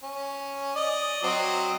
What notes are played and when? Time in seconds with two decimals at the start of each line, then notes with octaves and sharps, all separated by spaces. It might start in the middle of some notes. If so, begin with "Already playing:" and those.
0.04 C#4
0.76 D5 D#5
1.23 F#3 C4 D#5